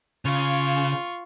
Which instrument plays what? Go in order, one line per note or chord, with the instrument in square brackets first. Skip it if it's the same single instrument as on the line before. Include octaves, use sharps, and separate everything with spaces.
[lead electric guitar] C#3 [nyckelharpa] F4 C#6